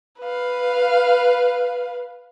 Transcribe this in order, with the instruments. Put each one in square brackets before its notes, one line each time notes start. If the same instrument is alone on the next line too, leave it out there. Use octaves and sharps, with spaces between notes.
[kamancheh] B4 F5